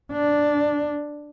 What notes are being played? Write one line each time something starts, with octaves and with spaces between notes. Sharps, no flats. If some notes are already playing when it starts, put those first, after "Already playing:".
D4